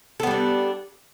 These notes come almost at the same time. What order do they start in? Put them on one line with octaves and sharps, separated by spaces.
A4 B3 G3 D4